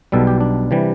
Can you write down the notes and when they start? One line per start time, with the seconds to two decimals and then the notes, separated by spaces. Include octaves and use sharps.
0.12 B1 B2 G3 A4
0.27 G4
0.41 D4
0.71 C3 E3 G3